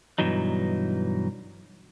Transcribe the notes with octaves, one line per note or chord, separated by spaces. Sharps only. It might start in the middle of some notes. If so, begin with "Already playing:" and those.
G2 B2 E3 F#3 D#4